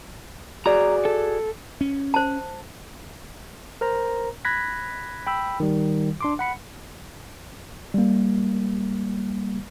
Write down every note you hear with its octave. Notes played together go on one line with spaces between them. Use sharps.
F#4 G#4 D5 A#5
A4
C#4
C5 A5
A#4 C5 A#5
B5 F#6 G#6 A#6 B6
G5 B5 E6
D#3 G3
D4 C6 D6
F#5 B5 C#7
G3 A#3